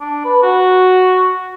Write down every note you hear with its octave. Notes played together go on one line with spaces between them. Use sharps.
D4
B4
F#4